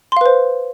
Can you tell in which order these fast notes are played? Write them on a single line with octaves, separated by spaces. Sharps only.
C6 F5 B4 C5